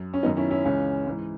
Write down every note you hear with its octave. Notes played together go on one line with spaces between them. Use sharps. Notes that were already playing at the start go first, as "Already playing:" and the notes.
Already playing: F#2
C#4
F#2 D#3 B3 D#4
C#4 E4
C#4 E4
C#2 C#3 E3 C#4
G#2 E3